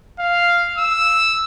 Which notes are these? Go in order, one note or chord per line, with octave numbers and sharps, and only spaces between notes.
F5
E6